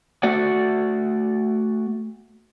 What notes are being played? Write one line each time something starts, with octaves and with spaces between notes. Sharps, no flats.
A3 F#4 D5 E5 F#5